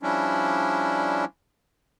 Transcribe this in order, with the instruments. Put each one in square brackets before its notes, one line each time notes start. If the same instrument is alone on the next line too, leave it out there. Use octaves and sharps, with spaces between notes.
[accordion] F3 G3 C#4 D4 E4